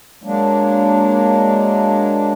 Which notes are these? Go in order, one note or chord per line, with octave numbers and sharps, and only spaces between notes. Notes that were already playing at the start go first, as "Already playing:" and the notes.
F#3 G#3 A#3 D4